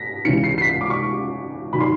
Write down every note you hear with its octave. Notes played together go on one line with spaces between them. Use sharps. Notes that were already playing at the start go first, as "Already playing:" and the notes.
Already playing: A#6 B6
C#2 C#3 E3 C#7
C7
C7
B6
D6
C#6
D#3 F#3 B5
C6